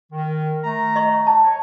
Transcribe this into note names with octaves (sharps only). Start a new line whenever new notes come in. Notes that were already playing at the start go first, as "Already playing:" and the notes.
D#3
A3 A#5
D#5 C#6
A5
C#5